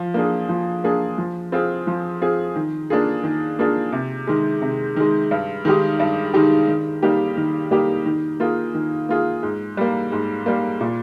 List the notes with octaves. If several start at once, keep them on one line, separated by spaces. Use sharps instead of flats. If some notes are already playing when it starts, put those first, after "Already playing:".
Already playing: F3
A#3 D4 G#4
F3
A#3 D4 G#4
F3
C4 F4 G#4
F3
C4 F4 G#4
D#3
A#3 D4 F4 G#4
D#3
A#3 D4 F4 G#4
C3
D#3 G#3
C3
D#3 G#3
G2
D#3 G#3 D#4 G4
G2
D#3 G#3 D#4 G4
D#3
G3 A#3 D#4 G4
D#3
G3 A#3 D#4 G4
D#3
A#3 F4 G#4
D#3
A#3 F4 G#4
G#2
G3 A#3
G#2
G3 A#3
A#2